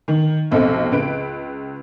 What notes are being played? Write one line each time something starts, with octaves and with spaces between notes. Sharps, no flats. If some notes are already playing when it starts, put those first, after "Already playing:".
D#3
F1 B1 C4 A4
C#2 B4 D7